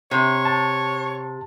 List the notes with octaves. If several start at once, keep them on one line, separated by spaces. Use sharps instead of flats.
C3 C#5
A5